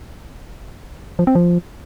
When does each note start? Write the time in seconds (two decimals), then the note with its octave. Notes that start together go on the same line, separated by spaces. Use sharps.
1.19 F3
1.27 C4
1.35 F3